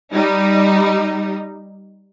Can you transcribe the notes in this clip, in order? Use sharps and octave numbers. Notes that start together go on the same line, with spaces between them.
G3 D#4